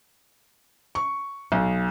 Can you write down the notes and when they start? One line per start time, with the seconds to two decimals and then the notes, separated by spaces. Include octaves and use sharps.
0.95 C#6
1.52 B1